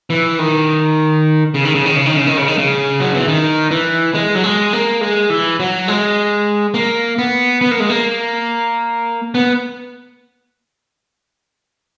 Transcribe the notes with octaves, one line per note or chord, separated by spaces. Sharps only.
E3
D#3
C#3
D#3
C#3
D#3
C#3
D#3
C#3
D#3
C#3
D#3
C#3
F#3
E3
D#3
E3
G#3
F#3
G#3
A#3
G#3
E3
F#3
G#3
A#3
B3
B3
A#3
G#3
A#3
B3